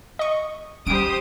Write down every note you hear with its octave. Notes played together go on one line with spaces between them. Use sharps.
D#5 C#6
G3 C#4 G4 C5 D#6 D7